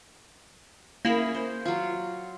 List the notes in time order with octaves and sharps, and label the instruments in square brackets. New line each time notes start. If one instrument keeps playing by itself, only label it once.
[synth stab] A#3 E4 [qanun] C#4 G#4 B5
[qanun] C5
F#3 F4